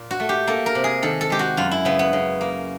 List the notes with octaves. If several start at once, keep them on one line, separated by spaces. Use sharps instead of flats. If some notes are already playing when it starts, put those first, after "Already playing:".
Already playing: A#2
F#4
A3
G4
A#3 A4
A#4
C3
G#4
D#3 A4
A4
G#3 G4
F#4
F#2 F4
E4
C#3 B3
B3
C#3
A#3